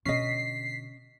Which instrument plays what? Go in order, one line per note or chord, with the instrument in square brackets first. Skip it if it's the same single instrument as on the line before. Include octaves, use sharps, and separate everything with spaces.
[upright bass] B2 D3 [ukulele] C#4 D#5 [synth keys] B6 C7